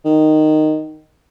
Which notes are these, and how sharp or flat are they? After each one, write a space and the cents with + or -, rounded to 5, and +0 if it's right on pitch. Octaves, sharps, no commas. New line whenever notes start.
D#3 -10